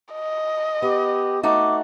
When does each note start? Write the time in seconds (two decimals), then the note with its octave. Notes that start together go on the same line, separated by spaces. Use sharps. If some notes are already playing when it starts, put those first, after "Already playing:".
0.13 D#5
0.82 B3 G4
1.43 A3 D#4 F#4 D6